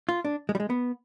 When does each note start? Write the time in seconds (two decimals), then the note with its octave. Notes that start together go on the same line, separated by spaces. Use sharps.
0.09 F4
0.25 D4
0.49 G#3
0.55 G3
0.60 G#3
0.70 B3